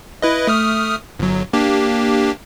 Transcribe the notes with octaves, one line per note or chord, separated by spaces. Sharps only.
E4 B4 D#5
A3 D#6 F6
G1 F#3
A#3 D4 G4